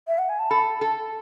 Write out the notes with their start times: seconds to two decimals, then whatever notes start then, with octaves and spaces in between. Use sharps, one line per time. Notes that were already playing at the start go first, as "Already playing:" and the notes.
0.08 E5
0.18 F#5
0.29 G#5
0.39 A5
0.50 A4 B5
0.81 A4 A5